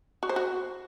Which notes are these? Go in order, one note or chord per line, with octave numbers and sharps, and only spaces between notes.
F#4
C5
F#4